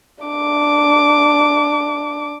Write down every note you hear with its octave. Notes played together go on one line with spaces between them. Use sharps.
D4 D6